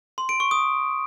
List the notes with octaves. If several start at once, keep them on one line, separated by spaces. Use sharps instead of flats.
C6
D7
C#6
D#6